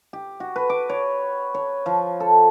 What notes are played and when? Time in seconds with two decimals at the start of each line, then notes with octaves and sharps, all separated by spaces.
0.13 G4
0.40 F#4
0.56 B4
0.70 D6
0.89 C#5
1.54 C#5
1.86 F3
2.20 A4